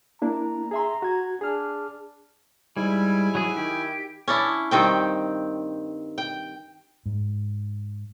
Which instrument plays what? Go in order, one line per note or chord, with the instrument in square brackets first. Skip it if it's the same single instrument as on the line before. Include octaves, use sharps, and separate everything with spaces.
[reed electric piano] A#3 D4 E4 [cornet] A#5
[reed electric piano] G#4 E5 C6 [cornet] A#5
[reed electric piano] F#4 G#6
[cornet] D4 [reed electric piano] G#4 F6
[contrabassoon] G#2 [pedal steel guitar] G3 [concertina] E4 G#5
[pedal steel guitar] F#3 G#4
[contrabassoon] D#3 [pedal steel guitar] G4
[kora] C#4 D4 E4
G2 D#3 C4 G5
G5
[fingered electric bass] G#2